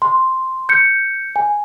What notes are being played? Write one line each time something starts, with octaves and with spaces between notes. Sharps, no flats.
C6
G6 C#7
G#5